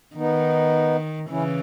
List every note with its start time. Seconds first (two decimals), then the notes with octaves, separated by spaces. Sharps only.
0.16 D#3 B3 D#4
1.30 C#3 E3 C#4 E4